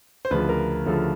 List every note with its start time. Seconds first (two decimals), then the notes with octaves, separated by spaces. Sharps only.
0.25 C5
0.31 D2 C#3 F3 B4
0.49 A#4
0.86 D2 C#3 F3 A4